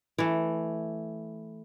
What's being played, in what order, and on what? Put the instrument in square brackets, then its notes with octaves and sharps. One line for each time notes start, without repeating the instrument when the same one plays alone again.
[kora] E3 A3